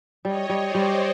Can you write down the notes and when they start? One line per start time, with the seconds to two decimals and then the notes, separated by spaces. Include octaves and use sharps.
0.25 G3 C#5 D#5
0.49 G3
0.61 C5 D5
0.74 G3